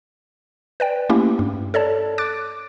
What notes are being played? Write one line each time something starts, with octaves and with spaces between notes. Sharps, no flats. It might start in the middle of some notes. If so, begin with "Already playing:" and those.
B4 D5 G5
A3 A#3 C#4 E4 G4
G2
A4 C#5 D5 A5
D6 F#6 A6 D7